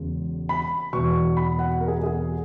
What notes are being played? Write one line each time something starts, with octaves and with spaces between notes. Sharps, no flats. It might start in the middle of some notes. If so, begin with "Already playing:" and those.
Already playing: E1 E2 C#3 G#3
B5
E1 E2 B2 C#6
B5
F#5
A#4
G#4
G#4